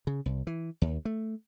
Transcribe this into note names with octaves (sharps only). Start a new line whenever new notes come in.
C#3
C2
E3
D#2
A3